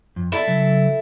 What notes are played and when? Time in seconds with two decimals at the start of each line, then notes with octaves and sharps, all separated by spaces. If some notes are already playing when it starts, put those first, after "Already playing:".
0.16 F2
0.32 E4 A4 D5
0.47 C#3 F#3